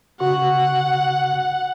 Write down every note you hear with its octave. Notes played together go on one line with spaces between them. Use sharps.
C#3 F#4 F#5 C#6